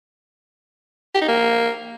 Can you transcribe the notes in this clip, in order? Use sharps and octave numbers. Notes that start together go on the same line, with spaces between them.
G4
D#4
A#3